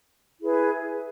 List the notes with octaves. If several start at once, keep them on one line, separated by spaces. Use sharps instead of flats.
E4 G#4 B4